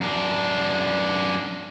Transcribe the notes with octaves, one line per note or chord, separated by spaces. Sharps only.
F#2 D4